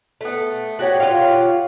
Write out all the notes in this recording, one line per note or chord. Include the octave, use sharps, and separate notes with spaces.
A3 B3
F#4 G4 C#5 F#5
F4 G4 C#5 F5